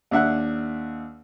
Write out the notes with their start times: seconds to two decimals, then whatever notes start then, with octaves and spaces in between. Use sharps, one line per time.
0.11 D#2 D4 E5 F#5 F#6